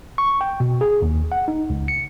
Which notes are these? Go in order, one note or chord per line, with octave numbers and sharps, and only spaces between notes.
C#6
G5
B2
G#4
D#2
F#5
D#4
C#2
C#7